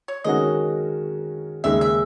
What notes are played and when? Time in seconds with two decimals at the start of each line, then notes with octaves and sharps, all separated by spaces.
0.08 C#5
0.24 D#3 G#3 C#4 F#4 A#4 D#5
1.64 D#2 C#3 G#3 E5
1.81 E5